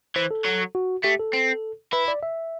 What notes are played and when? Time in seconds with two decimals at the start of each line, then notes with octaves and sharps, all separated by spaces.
0.16 E3 C5
0.31 A4
0.45 F#3
0.75 F#4
1.04 A3 G4
1.20 A4
1.33 C4
1.93 E4 B4
2.08 D5
2.23 E5